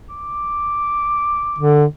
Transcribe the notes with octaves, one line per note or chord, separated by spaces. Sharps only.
D6
D3